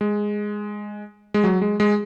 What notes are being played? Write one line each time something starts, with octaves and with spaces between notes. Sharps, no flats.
G#3
G#3
F#3
G#3
G#3